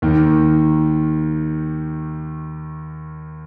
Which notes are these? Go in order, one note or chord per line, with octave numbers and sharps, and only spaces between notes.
D#2 D#3 A#3